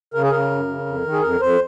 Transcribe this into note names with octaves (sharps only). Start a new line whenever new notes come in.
C#3 A#4
G#4
C#3 A#4
F#2
C#3
F2
D#3
G#4
F2 A#4
F2 C5